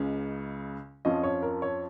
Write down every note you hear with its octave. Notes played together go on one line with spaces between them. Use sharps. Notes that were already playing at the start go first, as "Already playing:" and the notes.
Already playing: C#2 C#3 G#3 C#4
F2 F3 C#4 D#5
C#5
A#4
C#5